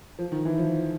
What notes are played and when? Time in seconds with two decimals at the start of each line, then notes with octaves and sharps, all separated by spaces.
0.19 F3
0.32 D#3
0.45 E3
0.58 F3